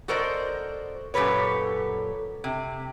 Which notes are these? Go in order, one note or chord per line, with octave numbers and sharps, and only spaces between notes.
F#4 A4 A#4 C5 D5 D#5
F#2 A#2 G4 A4 B4 C#5
C3